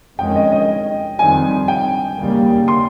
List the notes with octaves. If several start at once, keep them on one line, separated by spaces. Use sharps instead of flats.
F2 D#3 G#3 C#4 G5
D#5
D#5
F2 D#3 G3 C4 G#5
G5
D#2 C#3 G3 A#3
C6